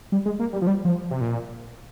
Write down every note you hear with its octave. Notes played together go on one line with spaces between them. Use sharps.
G3
G#3
A#3
G3
F3
G3
F3
C3
A#2